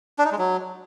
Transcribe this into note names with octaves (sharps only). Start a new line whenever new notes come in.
D4
D#4
G#3
F#3